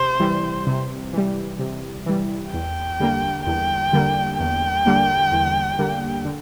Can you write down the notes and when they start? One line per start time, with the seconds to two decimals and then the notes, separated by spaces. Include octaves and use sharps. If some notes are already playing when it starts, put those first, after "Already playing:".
Already playing: C3 C5
0.20 E3 G3
0.67 C3
1.13 E3 G3
1.60 C3
2.06 E3 G3
2.53 E2 G5
3.00 D3 G3 A#3
3.46 E2 G5
3.93 D3 G3 A#3
4.40 E2 G5
4.86 D3 G3 A#3
5.32 E2
5.79 D3 G3 A#3
6.25 D3